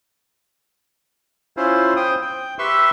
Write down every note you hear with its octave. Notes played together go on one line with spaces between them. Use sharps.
C#4 E4 F4 C5
C5 G5 D#6
G5
G4 B4 E5 C6 C#6 E6